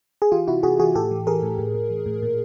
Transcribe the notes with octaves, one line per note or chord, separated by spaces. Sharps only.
G#4
E3 F4 G4
C3 E4 F#4
C3 F#4 G#4
E3 F#4 G#4
A2 G4 A4
E3
E3 G#4 A#4
A2
A2
A2
E3
A2
A#2